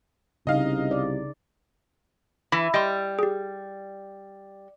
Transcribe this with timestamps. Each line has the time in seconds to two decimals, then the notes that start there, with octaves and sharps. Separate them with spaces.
0.47 C2 C#3 D#4 D#5 F5
0.91 D5
2.52 E3 B5 B6
2.74 G3 D#5 C6
3.19 G4 G#4